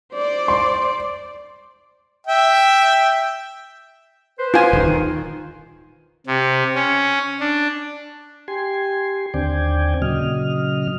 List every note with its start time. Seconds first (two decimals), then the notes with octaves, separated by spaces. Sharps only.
0.14 C5 D5
0.48 C6
2.27 E5 G5
4.39 B4 C5
4.54 F4 G#5
4.73 D#1 D#3
4.88 D#3
6.27 C3
6.75 C#4
7.40 D4
8.48 G4 G#5 C6
9.34 D#2 D3 C4 D5 G5 G#5
10.02 A#2 C#3 F#3 D#5 F6